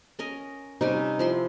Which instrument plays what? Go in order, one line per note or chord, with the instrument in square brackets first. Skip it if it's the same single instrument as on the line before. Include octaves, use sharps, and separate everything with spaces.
[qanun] C#4 A#4 D#5
[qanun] C3 G3 C#4 [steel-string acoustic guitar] D#4
[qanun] F3 E4 C6